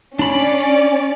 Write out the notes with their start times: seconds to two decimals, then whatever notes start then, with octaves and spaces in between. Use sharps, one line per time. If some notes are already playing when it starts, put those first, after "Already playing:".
0.19 C#4 D4 D5 B5